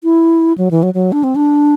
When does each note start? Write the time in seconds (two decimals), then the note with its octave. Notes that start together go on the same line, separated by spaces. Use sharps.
0.04 E4
0.58 F#3
0.71 E3
0.83 F#3
0.94 F#3
1.12 D4
1.24 C4
1.36 D4